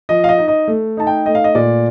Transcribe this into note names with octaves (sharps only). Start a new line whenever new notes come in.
F3 D#5
F5
D#5
D#4
D#5
A3
D#4 A5
G5
A3 D#5
F5
D#5
A#2 D5